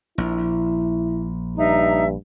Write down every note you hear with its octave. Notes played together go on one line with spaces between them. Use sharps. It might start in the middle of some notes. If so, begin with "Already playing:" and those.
A#1 E4
G2 D#4 E5 A#5